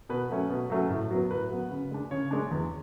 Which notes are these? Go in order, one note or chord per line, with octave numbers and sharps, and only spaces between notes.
B2 B4
F#3 A3 C#4
B2
F#3 A3 C#4
A2
F#3 B3
A2 B4
F#3 B3
C#3
G#3 D4
C#3 C#5
G#3 D4
E2